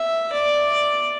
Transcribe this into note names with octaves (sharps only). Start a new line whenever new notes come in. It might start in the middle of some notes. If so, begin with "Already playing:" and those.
Already playing: E5
D5